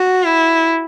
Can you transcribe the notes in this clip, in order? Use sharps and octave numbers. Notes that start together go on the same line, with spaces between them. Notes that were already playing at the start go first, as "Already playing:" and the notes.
Already playing: F#4
E4